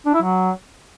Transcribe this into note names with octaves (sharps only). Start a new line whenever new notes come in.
D4
E4
F#3